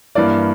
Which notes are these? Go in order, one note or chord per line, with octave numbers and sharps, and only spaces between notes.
G2 E3 A#3 D5